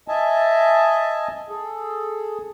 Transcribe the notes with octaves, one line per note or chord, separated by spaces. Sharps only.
D#5 E5 G#5 A5
G#4 A4